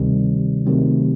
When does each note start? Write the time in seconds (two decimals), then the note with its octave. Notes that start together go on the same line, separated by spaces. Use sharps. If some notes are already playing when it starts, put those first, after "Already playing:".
Already playing: D2 C3 D#3 G3
0.66 C3 D#3 F#3 A3 C4